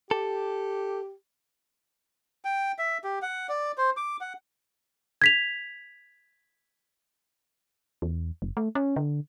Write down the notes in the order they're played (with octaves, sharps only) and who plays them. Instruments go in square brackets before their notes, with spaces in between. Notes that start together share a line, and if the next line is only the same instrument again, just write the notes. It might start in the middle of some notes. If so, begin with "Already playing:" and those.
[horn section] G4 [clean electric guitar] A4
[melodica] G5
E5
G4
F#5
D5
C5
D6
F#5
[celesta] G#6 B6 F7
[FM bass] E2
F#1
A3
C#4
D3